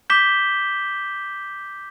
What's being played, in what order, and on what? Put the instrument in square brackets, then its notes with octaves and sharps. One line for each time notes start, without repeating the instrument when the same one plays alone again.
[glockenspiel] D6 G6 B6 E7 G7